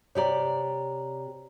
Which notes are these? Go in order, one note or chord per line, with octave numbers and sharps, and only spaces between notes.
C3 G4 C#5 D5 A#5